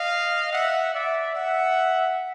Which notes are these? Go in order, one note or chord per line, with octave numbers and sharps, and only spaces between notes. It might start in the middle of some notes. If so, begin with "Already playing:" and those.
Already playing: D#5 F5
E5 F#5
D5 E5
E5 F#5